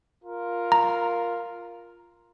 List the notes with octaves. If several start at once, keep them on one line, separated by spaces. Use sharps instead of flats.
F4 A#4
A#5